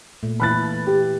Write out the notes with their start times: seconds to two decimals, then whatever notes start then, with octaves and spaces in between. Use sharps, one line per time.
0.23 A#2 A3
0.40 A#2 E3 E4 B5 F#6 A6
0.87 G4